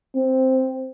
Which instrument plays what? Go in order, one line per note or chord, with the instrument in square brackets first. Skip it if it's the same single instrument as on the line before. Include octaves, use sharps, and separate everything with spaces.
[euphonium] C4